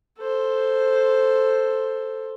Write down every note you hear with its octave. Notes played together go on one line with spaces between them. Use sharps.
A4 C5